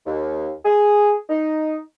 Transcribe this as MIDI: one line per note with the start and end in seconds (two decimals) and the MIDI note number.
0.06 0.51 39
0.65 1.15 68
1.30 1.77 63